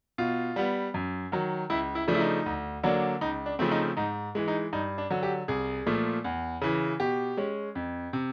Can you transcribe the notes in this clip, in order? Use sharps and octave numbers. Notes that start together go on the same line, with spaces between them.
B2 F4
G3 B3
F#2
D#3 F#3
C#2 E4
E4
C#3 F3 A3 D4
E4
D#4
D2
D3 F#3 A#3 D4
C#2 D#4
D4
C#3 F3 A3 C4
D#4
G#2 D#4
E3 G#3
D#4
G2 D#4
D4
D3 F#3
G4
C2 G#4
A#2 F3 A3
E2
C#3 E3
B2 G4
G#3 C#4
F2
C3